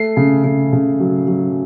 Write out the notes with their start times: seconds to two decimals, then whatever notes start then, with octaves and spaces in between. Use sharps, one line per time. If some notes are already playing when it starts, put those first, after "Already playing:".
Already playing: A3 C7
0.17 C#3
0.44 C#3
0.73 C#3
1.00 F#3
1.28 F#3